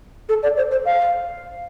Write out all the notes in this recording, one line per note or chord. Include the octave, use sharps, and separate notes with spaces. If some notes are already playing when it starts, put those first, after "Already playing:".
A4
D5
C5
C5
F5